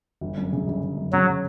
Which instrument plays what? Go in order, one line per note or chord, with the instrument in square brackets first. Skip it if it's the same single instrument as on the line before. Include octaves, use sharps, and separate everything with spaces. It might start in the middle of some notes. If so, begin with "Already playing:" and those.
[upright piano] G1
F#2
C#3
G1
G1
F#2
[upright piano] C#3 [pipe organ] F#3